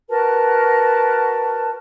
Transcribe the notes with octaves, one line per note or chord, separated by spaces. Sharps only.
F#4 A#4 B4 A5